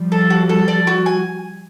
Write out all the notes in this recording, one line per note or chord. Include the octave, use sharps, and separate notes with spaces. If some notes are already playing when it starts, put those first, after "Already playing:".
Already playing: F3 G3
A4
F#4
A4
D5
F#4
G#5